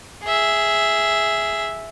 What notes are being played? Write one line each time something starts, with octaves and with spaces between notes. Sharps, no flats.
G#4 E5